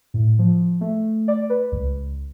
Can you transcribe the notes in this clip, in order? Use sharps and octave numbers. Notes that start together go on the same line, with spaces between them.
A2
F3
A3
D5
B4
C#2